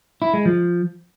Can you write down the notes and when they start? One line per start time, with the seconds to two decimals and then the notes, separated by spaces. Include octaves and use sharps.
0.22 E4
0.34 G#3
0.45 F3